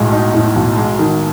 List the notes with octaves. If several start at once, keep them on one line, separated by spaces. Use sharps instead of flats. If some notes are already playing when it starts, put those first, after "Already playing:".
Already playing: B1 A2 G#3
D#4
A2
B1
G#3
D#3